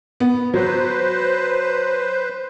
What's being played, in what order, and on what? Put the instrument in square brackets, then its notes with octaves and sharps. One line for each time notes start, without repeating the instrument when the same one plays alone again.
[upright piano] B3
[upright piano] F#3 [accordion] B4 C5